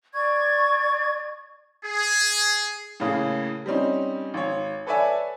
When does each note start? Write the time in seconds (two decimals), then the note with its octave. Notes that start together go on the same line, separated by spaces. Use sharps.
0.15 D5 C#6 G#6
1.85 G#4
3.00 A2 C#3 A#3 G#4
3.66 G3 C4 C#4 D#4
4.34 G#1 C#5
4.87 A4 B4 C#5 D5 E5 G#5